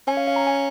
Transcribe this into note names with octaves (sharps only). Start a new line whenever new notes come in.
C#4 G#5
F5
F5
A#5
G#5